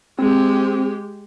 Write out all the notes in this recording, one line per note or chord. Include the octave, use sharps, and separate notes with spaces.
G#3 C4 G4